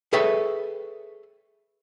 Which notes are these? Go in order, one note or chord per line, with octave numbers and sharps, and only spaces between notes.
G#4 A4 B4 C#5 E5 G5